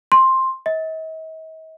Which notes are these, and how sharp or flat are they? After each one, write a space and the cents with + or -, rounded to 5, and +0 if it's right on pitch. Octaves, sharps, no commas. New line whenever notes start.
C6 +10
D#5 +45